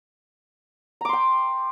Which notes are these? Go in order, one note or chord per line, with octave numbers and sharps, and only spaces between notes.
G5 A#5 C6 D6